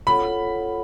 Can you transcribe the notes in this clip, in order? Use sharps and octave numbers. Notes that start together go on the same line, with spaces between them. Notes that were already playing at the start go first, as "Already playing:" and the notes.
F4 A4 C#5 F#5 B5